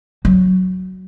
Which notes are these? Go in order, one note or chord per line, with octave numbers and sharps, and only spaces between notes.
F#3